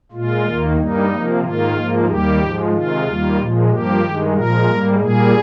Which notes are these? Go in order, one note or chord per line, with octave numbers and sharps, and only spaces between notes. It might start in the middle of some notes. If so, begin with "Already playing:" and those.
A#2 G#3 F4
D#2 D#3 A#3
G2 G3 A#3 D#4
C3 F3 A#3
G#2 D#3 A#3 F4
G#2 F3 A#3
D#2 D#3 G3 A#3 G4
G#2 F3 G#3
C3 D#3 G#3 F4
D#2 D#3 G3 A#3
A#2 F3 G#3
G2 F3 A#3 G4
G2 D#3 G#3
A#2 F3 G#3 A#4
G#2 G3 A#3
A#2 G3 A#3 G#4